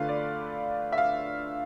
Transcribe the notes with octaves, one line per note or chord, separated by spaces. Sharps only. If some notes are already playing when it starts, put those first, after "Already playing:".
Already playing: D3 A3 D4 F4 B4 F5
D5
E5
F5